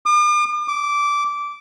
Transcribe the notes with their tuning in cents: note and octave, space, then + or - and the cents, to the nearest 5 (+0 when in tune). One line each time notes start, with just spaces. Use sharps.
D6 +45
D6 -15